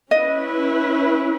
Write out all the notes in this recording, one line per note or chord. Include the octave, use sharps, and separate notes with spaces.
C#4 E4 B4 D#5